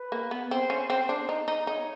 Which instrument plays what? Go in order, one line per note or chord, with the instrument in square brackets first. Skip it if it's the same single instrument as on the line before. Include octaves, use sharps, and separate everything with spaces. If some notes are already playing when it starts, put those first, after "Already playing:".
Already playing: [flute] B4
[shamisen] A#3
B3
[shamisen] C4 [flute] C5
[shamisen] C#4
C4
D4
D#4
D#4
[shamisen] D#4 [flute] C#5